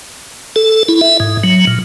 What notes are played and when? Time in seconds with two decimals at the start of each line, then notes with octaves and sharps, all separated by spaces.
0.56 A4
0.88 E4
1.01 E5
1.20 G#2
1.44 F#3
1.67 A#2